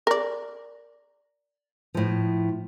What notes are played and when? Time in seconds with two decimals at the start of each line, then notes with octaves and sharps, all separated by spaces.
0.07 A#4 D5
1.94 A2 F3